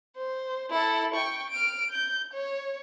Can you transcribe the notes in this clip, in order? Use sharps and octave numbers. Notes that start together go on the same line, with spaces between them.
C5
E4 A4
G5 C#6
F6 D7
G6
C#5